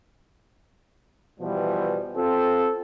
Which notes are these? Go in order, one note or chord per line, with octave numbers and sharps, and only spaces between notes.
B2 E3 F3 G3
C4 F4 A4